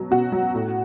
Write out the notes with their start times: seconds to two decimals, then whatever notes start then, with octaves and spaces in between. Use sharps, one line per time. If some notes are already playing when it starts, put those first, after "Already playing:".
Already playing: B2 F#3
0.11 B2 F#4
0.32 F#3
0.55 A2